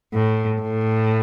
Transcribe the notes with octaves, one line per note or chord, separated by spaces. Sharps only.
A2
A2